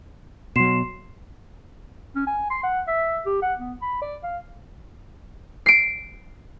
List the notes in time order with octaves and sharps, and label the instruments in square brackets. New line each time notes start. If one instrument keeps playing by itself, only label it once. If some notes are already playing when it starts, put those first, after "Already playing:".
[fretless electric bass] B2 F#3 [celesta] C6 C7 E7
[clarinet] C#4
G#5
C6
F#5
E5
G4
F#5
B3
B5
D5
F5
[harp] C7 D7